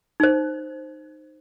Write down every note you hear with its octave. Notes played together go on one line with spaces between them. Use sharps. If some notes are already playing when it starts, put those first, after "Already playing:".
D#4 C5